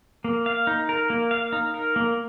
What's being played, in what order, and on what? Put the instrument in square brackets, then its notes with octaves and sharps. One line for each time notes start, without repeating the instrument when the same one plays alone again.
[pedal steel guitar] A#3
F5
D#4
A#4
A#3
F5
D#4
A#4
A#3